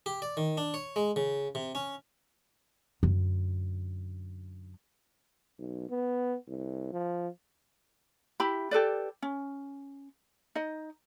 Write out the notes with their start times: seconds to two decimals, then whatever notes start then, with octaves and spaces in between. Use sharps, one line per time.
0.06 G4
0.22 D5
0.37 D#3
0.57 D4
0.74 C#5
0.96 G#3
1.16 C#3
1.55 C3
1.75 C#4
3.03 F#2 D3
5.59 B1
5.90 B3
6.48 C2
6.93 F3
8.40 E4 G4 B5
8.71 G4 A4 B4 D5
9.22 C#4
10.55 D#4 D#5